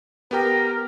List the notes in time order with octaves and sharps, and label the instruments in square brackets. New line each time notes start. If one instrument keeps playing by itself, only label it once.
[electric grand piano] B3 G4 G5 [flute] A#4